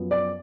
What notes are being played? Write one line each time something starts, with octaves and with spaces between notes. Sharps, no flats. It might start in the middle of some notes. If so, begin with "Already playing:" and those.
Already playing: F#2 F3 B3
D5